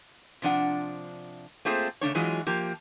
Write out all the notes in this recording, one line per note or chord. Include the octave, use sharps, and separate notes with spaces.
C3 F3 D4 F#5
A3 A#3 C4 F4 G#4 C5
C#3 A3 D4 C#5
E3 F#3 G#3 F4
F3 A#3 G4